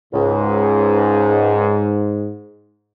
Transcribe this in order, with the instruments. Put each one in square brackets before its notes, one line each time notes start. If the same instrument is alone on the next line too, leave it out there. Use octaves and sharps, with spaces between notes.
[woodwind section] C#2 [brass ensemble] G#2